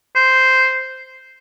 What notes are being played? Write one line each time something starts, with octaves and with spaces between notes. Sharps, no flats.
C5